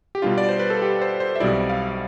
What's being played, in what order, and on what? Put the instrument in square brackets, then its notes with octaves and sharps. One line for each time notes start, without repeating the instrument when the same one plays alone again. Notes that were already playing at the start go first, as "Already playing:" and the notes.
[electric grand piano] G4
B2 G3 D4 F4
D5
C5
B4
A4
G4
C5
C5
E5
B1 B2 G3 C4 E4 D5
F5